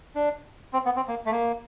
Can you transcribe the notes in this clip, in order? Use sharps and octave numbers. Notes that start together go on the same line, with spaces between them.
D4
C4
B3
C4
A#3
A3
A#3